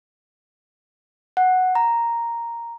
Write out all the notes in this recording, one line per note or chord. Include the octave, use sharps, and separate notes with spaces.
F#5
A#5